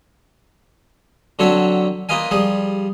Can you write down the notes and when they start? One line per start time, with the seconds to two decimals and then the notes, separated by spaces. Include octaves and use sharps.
1.39 D3 F#3 C4 D4 C#5 E5
2.09 A#3 F4 B4 D#5 F5 G#5
2.31 F3 G3 G#4